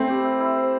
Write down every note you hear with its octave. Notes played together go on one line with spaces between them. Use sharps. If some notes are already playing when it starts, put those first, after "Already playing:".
Already playing: A3 C4 E4 C5
G4
E5
E4
C5